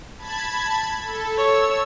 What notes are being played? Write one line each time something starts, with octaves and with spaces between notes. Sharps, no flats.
A5 B5 G#6
A4
C#5 E6